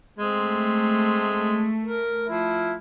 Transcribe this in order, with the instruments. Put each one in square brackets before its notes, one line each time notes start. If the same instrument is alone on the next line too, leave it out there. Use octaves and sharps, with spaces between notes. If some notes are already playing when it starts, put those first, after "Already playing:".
[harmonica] G#3 C4 [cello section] A3
[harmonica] A#4
F3 E4